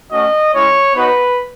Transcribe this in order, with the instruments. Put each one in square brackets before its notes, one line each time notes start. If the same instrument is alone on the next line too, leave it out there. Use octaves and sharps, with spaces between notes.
[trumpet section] A3 C#4 F#4 D#5
G#3 C#4 E4 C#5
B3 D#4 F#4 B4